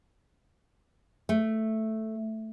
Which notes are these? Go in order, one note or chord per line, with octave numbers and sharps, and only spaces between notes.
A3